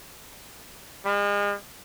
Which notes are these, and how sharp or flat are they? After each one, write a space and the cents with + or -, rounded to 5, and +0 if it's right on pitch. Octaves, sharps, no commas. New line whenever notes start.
G#3 -40